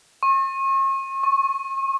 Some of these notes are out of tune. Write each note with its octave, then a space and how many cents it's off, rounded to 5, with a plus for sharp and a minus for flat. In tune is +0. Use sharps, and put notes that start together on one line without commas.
C#6 -40
C#6 -15